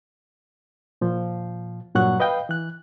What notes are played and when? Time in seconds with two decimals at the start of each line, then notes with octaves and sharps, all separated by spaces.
1.01 A#2 F3
1.95 G2 A#2 F#3 F#5 C#6 F#6
2.20 B4 D#5 F5 G5
2.49 E3 F#6